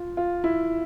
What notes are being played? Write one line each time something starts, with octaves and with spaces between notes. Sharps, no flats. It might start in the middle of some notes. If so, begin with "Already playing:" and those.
Already playing: F4
F4
E4